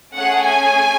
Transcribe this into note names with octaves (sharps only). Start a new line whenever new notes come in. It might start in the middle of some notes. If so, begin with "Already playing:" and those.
A3 C#4 G#4 F#5
G#5